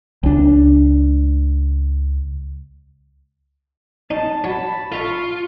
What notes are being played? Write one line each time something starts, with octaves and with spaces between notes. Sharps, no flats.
C#2 D4
C#4 D#4 A5
F#3 C#5 A5 B5
F4 A4 E5 A5 C#6